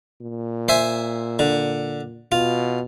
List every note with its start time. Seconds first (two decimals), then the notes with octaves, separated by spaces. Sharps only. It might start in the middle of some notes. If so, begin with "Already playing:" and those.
0.22 A#2
0.68 C5 E5 G#5
1.39 D3
2.32 B2 F4